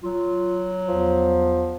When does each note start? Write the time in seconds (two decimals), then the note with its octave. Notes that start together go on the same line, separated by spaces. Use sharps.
0.03 F#3 F4
0.88 E2 F3